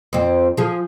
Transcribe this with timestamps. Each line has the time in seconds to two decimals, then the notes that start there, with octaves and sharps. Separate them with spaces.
0.13 F2 C4
0.57 F3 G#4